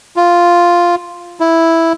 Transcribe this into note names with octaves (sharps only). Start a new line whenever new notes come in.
F4
E4